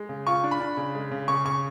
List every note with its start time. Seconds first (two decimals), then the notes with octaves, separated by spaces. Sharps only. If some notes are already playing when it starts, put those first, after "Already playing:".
Already playing: G#3
0.09 C#3
0.27 F4 C#6
0.44 D4
0.51 B5
0.60 D4
0.77 C#3
0.95 G#3
1.11 C#3
1.28 C#3 C#6
1.45 C#3 C#6